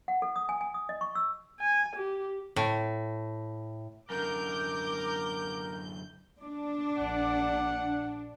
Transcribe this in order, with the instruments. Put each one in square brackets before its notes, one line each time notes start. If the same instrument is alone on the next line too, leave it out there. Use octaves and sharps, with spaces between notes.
[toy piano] F#5
A4
D#6
G#5
G#5
D#6
D#5
C#6
E6
[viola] G#5
G4
[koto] A2
[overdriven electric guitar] F#2 D3 [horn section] A#4 [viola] D6 [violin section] G6
[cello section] D4
[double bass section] A#1 [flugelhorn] F#5